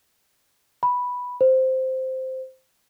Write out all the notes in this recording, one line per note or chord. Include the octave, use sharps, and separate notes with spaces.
B5
C5